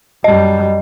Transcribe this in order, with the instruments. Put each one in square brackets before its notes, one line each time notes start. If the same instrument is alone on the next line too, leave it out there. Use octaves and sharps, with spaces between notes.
[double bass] F#2 G3 [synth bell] D#5